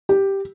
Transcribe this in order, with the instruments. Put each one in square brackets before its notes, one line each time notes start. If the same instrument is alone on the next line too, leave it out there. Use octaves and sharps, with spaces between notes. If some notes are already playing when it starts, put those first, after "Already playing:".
[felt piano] G4